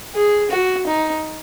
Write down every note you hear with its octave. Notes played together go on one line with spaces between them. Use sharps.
G#4
F#4
D#4